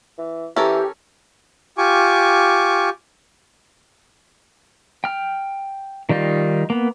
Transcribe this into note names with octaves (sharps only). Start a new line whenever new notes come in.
E3
E3 C#4 G4 A4 A#4
F4 G4 G#5 C#6 D6
G5 F6
D#3 G3 D#4 F4
A#3 B3